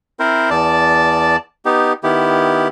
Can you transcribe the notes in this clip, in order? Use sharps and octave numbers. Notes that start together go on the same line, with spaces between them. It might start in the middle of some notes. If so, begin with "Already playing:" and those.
C4 E4 A#4 C5
E2 D5 A5
B3 D#4 G4
D#3 B3 E4 G4